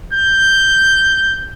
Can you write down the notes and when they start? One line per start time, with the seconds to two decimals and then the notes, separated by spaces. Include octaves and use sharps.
0.14 G6